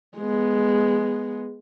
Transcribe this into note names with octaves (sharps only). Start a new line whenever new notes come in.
G#3 B3